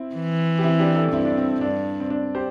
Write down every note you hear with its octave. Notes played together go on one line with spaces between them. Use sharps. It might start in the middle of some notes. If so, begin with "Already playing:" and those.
Already playing: C4 E4
E3
G4
C4 E4
D4 G4
E4 A4
G2 C4 E4
D4
C4
G2 D4
C4
D4
G4 C5